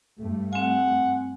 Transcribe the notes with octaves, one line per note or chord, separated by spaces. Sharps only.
G2 A3
C4 F#5 G#5